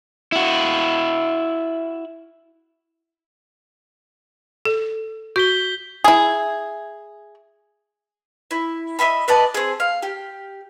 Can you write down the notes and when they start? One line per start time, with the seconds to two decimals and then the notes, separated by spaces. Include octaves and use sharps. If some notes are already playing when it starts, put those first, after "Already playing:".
0.32 E4 F#4
4.65 A4
5.36 F#4 G6 B6 G7
6.04 E4 G#4
8.51 E4
8.99 D#5 E5 G#5 B5
9.28 B4 D5 D#5 A5
9.54 C4 G#4
9.80 F5
10.02 G4